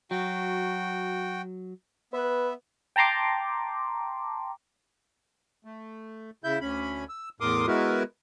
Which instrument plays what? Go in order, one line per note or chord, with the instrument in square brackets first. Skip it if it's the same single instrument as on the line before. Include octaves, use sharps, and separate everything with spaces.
[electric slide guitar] F#3 [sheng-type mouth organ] F#4 G5
[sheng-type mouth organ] B3 E5 [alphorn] B4
[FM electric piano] G5 A5 A#5 C6 D6
[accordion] A3
C#3 E4 E5 G6
D2 C#4 B5
E6
E2 A2 A#4 C6 D6 D#6
G#3 B3 E4 F#4 A#4 B4